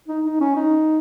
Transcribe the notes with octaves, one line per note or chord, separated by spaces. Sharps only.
D#4
D#4
C#4
D#4